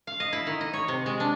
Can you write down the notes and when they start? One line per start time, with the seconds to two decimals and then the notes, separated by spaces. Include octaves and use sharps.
0.07 F5
0.20 D#5
0.33 E4
0.47 D#3
0.61 D#5
0.73 C#5
0.88 C3
1.06 G#3
1.20 D4